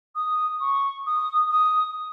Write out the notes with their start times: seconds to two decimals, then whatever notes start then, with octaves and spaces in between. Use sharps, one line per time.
0.15 D#6
0.61 C#6
1.06 D#6
1.51 D#6